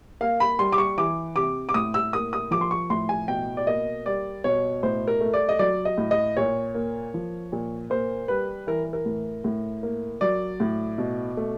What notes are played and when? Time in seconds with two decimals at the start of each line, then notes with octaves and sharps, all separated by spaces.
0.21 A#3 F5
0.40 B5
0.59 G3 C6
0.72 D6
0.78 C#6
0.97 E3 D6
1.36 C3 D6
1.69 D6
1.74 A2 D#6
1.94 E6
2.13 A#3 D#6
2.33 D#6
2.51 F3 D6
2.61 C6
2.71 C#6
2.90 A2 C6
3.09 G#5
3.28 B2 G5
3.57 D5
3.67 A#3 D#5
4.05 G3 D5
4.44 B2 C#5
4.83 A2 C5
5.08 A#4
5.21 A3
5.34 D5
5.49 D#5
5.59 F#3 D5
5.85 D#5
5.98 A2
6.11 D#5
6.37 A#2 C#5
6.75 A#3
7.14 F3
7.52 A#2
7.90 A#3 C5
8.28 G3 B4
8.67 E3 A#4
8.93 A#4
9.05 A2
9.44 A2
9.83 A#3
10.21 F#3 D5
10.60 A2
10.98 B2
11.37 A3